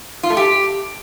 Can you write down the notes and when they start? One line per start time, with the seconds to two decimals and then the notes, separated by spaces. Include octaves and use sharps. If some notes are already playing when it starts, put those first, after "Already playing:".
0.23 F4
0.30 A3
0.37 G4